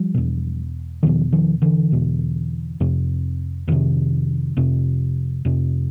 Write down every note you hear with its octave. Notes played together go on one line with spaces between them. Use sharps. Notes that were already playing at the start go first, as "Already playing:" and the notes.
Already playing: F3 G3
E2 B2
E2 B2 D#3 F3
D#3 F3
D3 E3
E2 B2
F2 C3
F2 C3 D#3
F2 C3
F2 C3